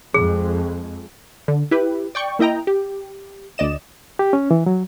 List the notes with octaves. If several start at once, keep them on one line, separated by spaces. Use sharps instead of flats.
F2 G#3 G#4
D3
E4 G4 B4
D5 G5 C#6
A#3 E4 D#5 G5 A#5
G4
D2 D5 D#5 E7
G4
C#4
E3
F#3